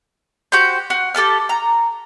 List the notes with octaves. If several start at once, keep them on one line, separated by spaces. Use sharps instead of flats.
F#4 G4 C5 G6
F#4
G4 A4 A5 F6
A#5